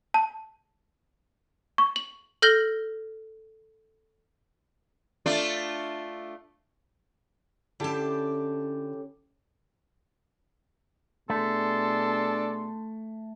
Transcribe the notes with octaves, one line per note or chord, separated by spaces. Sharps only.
A5
C#6
F#7
A4 F6 G6 A#6 F#7 G7
A3 D4 F4
D3 C#4 E4 G4 A4 A5
B2 A3 D4 G#4 A4 C6